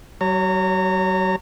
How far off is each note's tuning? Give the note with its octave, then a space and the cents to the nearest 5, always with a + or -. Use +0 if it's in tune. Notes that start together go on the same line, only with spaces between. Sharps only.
F#3 +40 C#5 +0 A#5 -30